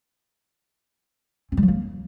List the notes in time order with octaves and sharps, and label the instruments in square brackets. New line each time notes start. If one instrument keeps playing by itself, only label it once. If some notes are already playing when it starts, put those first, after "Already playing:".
[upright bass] C4
G3
F#3
A#3